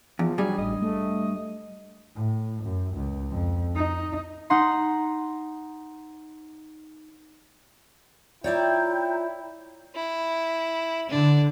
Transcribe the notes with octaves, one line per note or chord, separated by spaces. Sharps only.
E2 F3
G2 F#3 G3 G#4
A1 D#5
A3
A2
F#2
C#2
F2
D#4
D#4 F#5 A#5 C6
E4 F4 C#5 D5 E5 G5 A#5 G6
E4
D3 D4